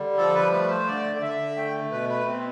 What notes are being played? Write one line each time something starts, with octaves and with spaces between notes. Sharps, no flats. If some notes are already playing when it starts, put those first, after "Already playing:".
Already playing: D3 G3
F3 A4
B4
A3 B4
C5
D3 D5
D5
D3 E5
A3 G5
B2 B4
B4
B2 C4